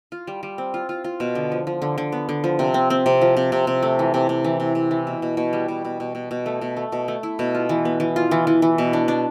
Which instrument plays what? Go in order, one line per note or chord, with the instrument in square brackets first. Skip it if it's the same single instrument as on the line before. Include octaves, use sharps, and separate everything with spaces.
[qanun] F4
G3
G3
C4
F4
F4
F4
B2
D3
F3
F3
D3
D3
B3
D3
F3
C3
C4
C4
C3
F3
C3
C3
C3
A3
E3
C3
C3
E3
C3
C3
E3
B2
B2
B2
G3
B2
B2
B2
B2
B2
A3
B2
A3
B2
A3
E4
B2
F4
E3
B3
E3
F4
E3
E3
E3
B2
D4
D4